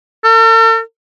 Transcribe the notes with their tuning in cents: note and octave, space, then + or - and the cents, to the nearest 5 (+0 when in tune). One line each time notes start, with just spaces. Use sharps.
A4 +45